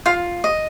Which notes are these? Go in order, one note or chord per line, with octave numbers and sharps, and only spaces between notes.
F4 F5
D#5